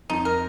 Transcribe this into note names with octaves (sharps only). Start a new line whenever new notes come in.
F2 D#4
A#4